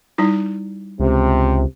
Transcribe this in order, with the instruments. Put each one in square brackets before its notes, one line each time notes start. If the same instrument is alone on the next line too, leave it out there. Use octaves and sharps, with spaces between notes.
[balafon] G3 D#4 E4
[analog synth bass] C#2 [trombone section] C3